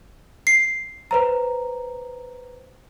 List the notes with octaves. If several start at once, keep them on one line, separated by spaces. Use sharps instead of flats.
C7
B4 C5 A#5